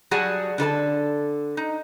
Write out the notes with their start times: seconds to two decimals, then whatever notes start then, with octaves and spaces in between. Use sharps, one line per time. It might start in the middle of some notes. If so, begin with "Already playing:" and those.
0.11 F#3 G3 F#4 G#4 F#5 A5
0.58 D3 A4 A#4 A5
1.57 D#4